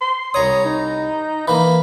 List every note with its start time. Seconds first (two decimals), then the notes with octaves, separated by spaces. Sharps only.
0.01 C6
0.34 C2 C#5 A#5 D#6
0.65 D#4
1.48 E3 A#3 B5